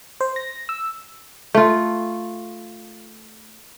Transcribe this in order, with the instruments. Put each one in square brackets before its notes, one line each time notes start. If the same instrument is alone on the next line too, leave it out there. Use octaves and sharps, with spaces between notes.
[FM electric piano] C5
A#6
E6
[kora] A3 F4